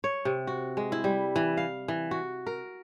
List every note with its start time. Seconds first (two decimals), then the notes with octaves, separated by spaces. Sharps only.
0.04 C#5
0.25 C3
0.47 F#4
0.77 G#3
0.92 E4
1.04 G3
1.36 E3
1.57 F5
1.88 E3
2.11 F#4
2.47 A#4